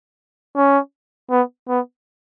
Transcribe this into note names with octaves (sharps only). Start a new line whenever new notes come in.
C#4
B3
B3